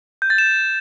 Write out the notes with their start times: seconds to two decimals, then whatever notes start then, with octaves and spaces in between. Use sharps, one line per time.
0.22 G6
0.30 A6
0.38 E7